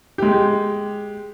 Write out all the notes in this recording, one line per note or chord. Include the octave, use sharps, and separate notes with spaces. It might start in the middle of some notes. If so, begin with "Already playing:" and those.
G#3 G4